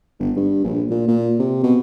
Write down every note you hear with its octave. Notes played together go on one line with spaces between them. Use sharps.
G1
G2
A#1
A#2
A#2
C3
B2